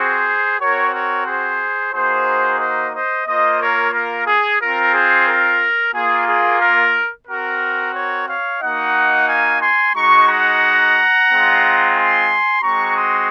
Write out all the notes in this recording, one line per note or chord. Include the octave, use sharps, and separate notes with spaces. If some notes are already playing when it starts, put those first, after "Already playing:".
Already playing: C4 F#4 G#4 C5
C4 F#4 A#4 C#5
A#4 C#5
G#4 C5
A#3 D#4 F#4 G#4 C5
C5 D#5
C5 D#5
A#3 F4 C5 D#5
A#4 C#5
A#4
G#4
C4 F4 A#4
G#4 C5
A#4
A#3 F4 G#4
G#4
A#4
C4 F#4 A#4
A#4 C#5
C#5 F5
A#3 D#4 F#4 D#5 F#5
F5 G#5
G#5 C6
G#3 D#4 F#4 A#5 C#6
F#5 A#5
G#3 C4 F4
G#5 C6
G#3 C4 F#4 A#5 C#6
C6 D#6